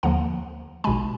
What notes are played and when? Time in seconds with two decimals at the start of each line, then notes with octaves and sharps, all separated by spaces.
0.03 D#2 D3 F3 A#3 F#5 A#5
0.84 B1 B2 G#3 G#5 B5